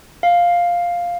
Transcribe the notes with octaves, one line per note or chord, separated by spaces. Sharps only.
F5